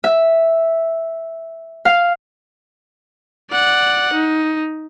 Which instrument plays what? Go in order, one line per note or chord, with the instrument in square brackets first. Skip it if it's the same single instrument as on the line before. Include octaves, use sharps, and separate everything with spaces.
[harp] E5
F5
[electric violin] D5 F#5
D#4